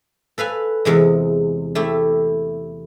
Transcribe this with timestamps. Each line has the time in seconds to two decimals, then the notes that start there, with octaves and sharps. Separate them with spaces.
0.38 A4 B4 F5 G#5
0.85 E2 C3 G#3
1.75 A3 E4 G4